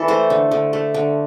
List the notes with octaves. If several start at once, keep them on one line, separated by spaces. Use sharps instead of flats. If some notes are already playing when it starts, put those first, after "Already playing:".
Already playing: E3 A4 D5
A3 C5
D3
D3
A3
D3